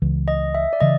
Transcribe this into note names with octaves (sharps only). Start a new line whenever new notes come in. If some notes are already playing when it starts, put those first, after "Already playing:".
C#2 C#3 E3
D#5
E5
D5
C#3 E3 D#5